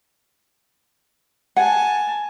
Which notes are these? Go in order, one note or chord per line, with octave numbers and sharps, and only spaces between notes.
F#5 G#5 A5